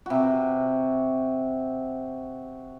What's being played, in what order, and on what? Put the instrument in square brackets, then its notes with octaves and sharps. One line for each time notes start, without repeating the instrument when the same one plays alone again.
[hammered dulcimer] C3 F#4